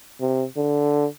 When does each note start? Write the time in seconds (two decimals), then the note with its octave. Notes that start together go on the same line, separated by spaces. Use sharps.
0.21 C3
0.57 D3